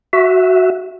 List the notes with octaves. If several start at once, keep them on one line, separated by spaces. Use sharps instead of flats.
F#4 E5